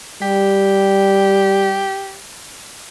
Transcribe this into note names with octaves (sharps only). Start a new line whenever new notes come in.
G3 G4